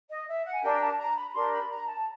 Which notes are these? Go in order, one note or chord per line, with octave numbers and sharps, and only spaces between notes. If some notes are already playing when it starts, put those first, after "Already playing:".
D#5
E5
F#5
G#5
D4 G4 A#4 G5
A5
A#5
B5
B5
D4 G4 A#4 C6
B5
A#5
A5